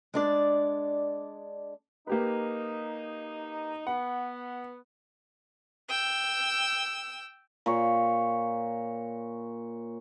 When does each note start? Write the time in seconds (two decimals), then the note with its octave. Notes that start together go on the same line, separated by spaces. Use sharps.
0.14 G#3 D4 D5
2.07 A#3 D#4 G4 B4
3.87 B3 F#5
5.90 G5 E6
7.66 A#2 C#5